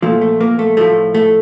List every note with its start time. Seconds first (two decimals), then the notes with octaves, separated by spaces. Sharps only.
0.02 A#2 F3 A3
0.21 A3
0.41 A#3
0.59 A3
0.77 A2 F3 A3
1.14 A3